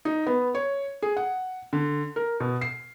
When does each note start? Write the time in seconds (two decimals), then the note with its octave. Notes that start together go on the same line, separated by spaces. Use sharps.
0.05 D#4
0.27 B3
0.55 C#5
1.02 G#4
1.17 F#5
1.73 D3
2.16 A#4
2.40 B2
2.61 C7